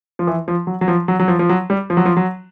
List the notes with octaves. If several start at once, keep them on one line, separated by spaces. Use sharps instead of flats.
F3
E3
F3
F#3
F#3
F3
F#3
F#3
F3
F3
F#3
G3
F3
F#3
F3
F#3